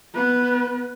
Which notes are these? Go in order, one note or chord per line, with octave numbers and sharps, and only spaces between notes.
B3 B4